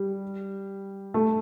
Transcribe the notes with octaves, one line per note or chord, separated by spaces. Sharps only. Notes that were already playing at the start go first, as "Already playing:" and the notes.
Already playing: G3
A3